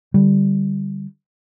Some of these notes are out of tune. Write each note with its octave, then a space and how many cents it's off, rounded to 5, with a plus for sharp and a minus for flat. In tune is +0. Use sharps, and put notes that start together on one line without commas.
D3 +0 G3 -5